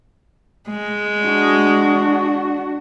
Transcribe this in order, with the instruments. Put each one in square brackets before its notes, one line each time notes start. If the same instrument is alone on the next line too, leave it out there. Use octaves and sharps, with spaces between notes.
[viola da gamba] G#3
[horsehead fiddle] D4 F#4